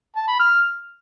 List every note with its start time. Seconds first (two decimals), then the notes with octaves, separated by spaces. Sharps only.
0.16 A5
0.28 B5
0.40 F6